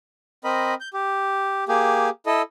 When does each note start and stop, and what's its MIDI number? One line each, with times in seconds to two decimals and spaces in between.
0.44 0.75 60
0.44 0.75 70
0.44 0.75 75
0.44 0.75 83
0.80 0.89 91
0.93 1.64 67
1.68 2.09 58
1.68 2.09 67
1.68 2.09 68
2.26 2.42 64
2.26 2.42 69
2.26 2.42 75